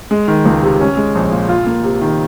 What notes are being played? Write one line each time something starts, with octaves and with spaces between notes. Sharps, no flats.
G#3
D#3
C#2
C3
C#4
G#3
A#1
A#2
F4
A#3
C3
D#3